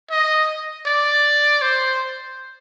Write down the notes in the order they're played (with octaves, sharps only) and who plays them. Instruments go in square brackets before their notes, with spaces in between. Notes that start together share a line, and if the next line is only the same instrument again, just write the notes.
[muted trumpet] D#5
D5
C5